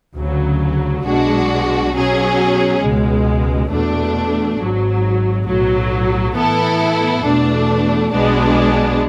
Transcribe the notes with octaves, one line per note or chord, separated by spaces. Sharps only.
D2 C#3 F#3
B1 B2 G#3 D4 F#4
B2 F#3 C#4 G#4
C#2 B2 G#3
E2 B2 A3 D4
G#1 G#2 F#3
B1 A2 F#3
A2 E3 B3 E4 A4
E2 B2 A3 D4
B1 B2 G#3 B3 D4